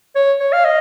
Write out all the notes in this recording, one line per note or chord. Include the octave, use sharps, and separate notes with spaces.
C#5
C#5
F5
D#5